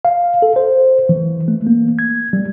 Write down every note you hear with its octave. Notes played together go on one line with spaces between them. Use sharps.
F5
A4
C5
E3
A3
A#3
G#6
G3